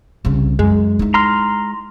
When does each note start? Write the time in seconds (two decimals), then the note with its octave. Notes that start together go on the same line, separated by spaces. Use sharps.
0.25 C2 C#3
0.59 F#2 G#3
0.99 D#4 E4
1.14 A#5 C6 F6